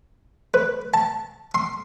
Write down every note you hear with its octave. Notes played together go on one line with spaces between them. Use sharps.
B4
A5
C6